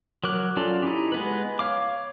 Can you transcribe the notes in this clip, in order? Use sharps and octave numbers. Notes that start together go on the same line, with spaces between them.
F#3 A#4 D6 F#6
F#3 C#4 F4 A4 D5
D#4 E4 G4
G#3 B3 B4
C#5 F5 D6